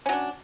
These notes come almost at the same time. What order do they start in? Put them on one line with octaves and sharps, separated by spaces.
C#4 F#3 D4